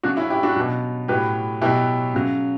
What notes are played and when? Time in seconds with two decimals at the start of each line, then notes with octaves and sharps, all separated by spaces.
0.03 C#3 F#3 D4 F#4
0.17 C#4 E4
0.30 E4 G4
0.43 D4 F#4
0.56 B2 F#3
1.08 A2 F#3 G4 B4
1.61 B2 F#3 E4 G4
2.14 C#3 F#3